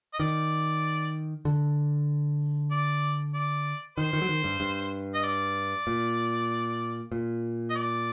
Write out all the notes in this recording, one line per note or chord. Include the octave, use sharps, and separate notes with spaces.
D#5
D#3 D5
D3
D5
D5
D#3 C5
D#3
F#3
D#3
G2
G2
D#5
D5
A#2
A#2
D#5
D5